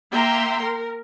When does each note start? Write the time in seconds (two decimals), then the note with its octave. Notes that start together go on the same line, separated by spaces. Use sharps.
0.11 A#3 E5 G5 A#5 C6
0.61 A#4